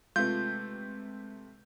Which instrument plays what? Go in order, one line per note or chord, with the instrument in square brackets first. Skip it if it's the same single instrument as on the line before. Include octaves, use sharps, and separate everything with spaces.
[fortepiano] C3 A3 [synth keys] G#3 B4 [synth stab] F4 [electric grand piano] G6